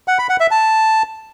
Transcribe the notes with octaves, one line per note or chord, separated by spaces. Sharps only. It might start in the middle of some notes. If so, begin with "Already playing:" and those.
F#5
B5
F#5
E5
A5